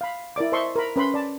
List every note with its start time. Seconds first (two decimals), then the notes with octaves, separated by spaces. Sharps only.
0.01 F5 B5
0.36 E4 A#4 D5 D6
0.52 C5 D#5 E5 A5 C6 C#6
0.76 A#4 B5
0.96 C#4 B4 B5 C6
1.14 D5 A5